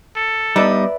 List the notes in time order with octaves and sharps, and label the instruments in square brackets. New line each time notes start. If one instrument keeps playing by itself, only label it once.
[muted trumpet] A4
[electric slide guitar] G3 B3 [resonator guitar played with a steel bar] D#4 [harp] B4 D5 E5